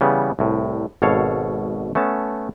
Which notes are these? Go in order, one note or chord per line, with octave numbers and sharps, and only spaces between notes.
C#3 E3 G3 B3
C2 A2
G#1 B2 A4 C#5 F5
A3 B3 C#4 A5